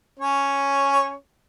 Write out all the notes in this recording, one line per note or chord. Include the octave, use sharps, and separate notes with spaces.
C#4 C#5